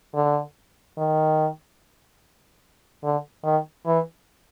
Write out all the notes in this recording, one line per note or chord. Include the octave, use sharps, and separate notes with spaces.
D3
D#3
D3
D#3
E3